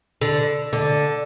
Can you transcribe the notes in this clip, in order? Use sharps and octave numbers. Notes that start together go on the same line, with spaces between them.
D3
D3